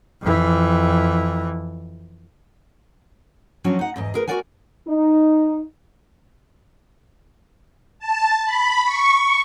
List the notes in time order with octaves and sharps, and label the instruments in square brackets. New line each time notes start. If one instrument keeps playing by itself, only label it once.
[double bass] F2 E3
[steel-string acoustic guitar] F3 F#3 C#4 D4 F#4
D#4 F#5
E2 G#2 D#5
G#4 A#4 B4
F#4 A4 A#4 D5 F#5 G#5
[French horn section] D#4
[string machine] A5
B5
C#6